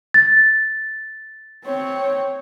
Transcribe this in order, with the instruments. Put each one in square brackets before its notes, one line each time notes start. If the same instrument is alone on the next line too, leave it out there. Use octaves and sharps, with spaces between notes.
[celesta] A6
[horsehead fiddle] C4 C#5